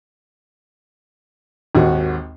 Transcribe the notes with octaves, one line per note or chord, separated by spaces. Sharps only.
G#1 D#2 F#4